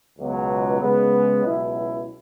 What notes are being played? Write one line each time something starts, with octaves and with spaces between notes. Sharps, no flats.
C#2 B2 F#3
C#3 G#3 B3
C#2 B2 F#3 E4